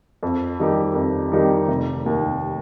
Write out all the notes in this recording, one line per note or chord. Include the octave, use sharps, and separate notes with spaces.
F2
D#3 G3 D#4 G4
F2
D#3 G3 D#4 G4
F1
D#2 D#3